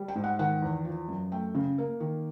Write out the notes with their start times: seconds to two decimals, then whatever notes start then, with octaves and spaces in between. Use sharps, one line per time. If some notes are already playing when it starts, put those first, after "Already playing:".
Already playing: G3
0.08 G5
0.15 G#2
0.24 F#5
0.39 D#3 F#5
0.62 E2
0.85 F3
1.09 F#2
1.32 A3 G5
1.55 C#3
1.78 A#3
2.00 D#3